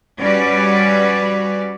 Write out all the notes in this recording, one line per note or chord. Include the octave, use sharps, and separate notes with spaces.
G3 C#4 F#4 B4 D5